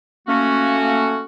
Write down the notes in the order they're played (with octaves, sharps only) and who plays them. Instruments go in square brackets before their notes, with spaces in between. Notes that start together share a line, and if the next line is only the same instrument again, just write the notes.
[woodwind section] A3 A#3 C#4 F#4